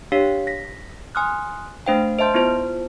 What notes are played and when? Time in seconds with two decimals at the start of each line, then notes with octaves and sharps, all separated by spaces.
0.12 D4 G4 C#5 F5 B6
0.47 A#6 B6
1.15 G#5 C6 D#6 F6 F#6
1.86 A3 D4 C5 F5 G5
2.19 C5 D#5 E5 A5 C6 G6
2.34 B3 E4 F4 C5 A5